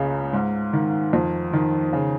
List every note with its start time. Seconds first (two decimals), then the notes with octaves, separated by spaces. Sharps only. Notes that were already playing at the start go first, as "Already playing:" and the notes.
Already playing: C#2 C#3
0.33 G#2
0.73 D#3
1.13 F2
1.53 D#3
1.93 C#3